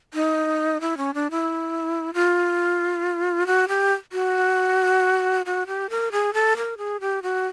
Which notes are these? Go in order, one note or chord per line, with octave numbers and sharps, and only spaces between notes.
D#4
E4
C#4
D4
E4
F4
F#4
G4
F#4
F#4
G4
A#4
G#4
A4
A#4
G#4
G4
F#4